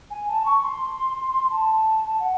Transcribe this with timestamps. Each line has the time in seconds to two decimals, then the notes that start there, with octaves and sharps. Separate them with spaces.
0.10 G#5
0.28 A5
0.45 C#6
0.63 C6
1.50 A5
2.20 F#5